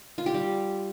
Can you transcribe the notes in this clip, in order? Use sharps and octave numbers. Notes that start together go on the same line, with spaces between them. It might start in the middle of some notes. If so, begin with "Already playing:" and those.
F4
G4
G3